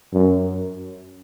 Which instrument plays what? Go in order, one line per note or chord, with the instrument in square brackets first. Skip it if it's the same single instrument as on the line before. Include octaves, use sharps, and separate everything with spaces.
[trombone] F#2